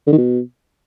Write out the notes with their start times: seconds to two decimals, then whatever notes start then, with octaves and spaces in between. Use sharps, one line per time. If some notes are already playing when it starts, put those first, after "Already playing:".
0.07 D3
0.12 D#3
0.18 B2